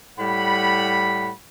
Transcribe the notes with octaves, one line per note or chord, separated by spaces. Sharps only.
A2 G3 F#5 B5